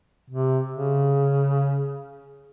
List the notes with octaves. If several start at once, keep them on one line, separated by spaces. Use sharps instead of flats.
C3
C#3